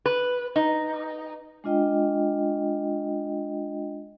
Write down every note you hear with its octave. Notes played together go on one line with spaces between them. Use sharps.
B4
D#4
G#3 D4 F4 D#5 G5